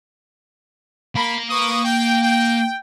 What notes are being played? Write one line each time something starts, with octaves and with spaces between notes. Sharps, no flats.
A#3 A#5 B5
B4 C#6 D#6
G5
G5